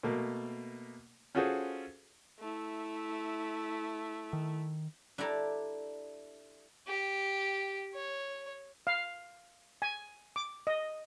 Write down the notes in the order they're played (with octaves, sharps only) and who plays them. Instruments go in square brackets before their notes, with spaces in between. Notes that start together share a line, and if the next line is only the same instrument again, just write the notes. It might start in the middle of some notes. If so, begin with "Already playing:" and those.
[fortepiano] B2 A3 A#3
C#4 F4 F#4 G#4 A4 C5
[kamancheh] A3 E4
[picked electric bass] D#3
[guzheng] D4 E4 G4 A4 D5 A#5
[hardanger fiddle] G4
C#5
[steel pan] F5
G#5
D6
D#5